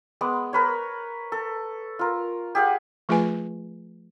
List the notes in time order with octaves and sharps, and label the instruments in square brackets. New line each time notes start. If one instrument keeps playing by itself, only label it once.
[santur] G#3 B3 D6
A#4 B4 C#5
A4
F4 A#4
G4 G#4 F5 F#5
[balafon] F3 A3 F4 G#4 B4 G#5